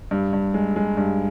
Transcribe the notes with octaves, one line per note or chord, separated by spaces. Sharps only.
G2
G2
G#3
G#3
G2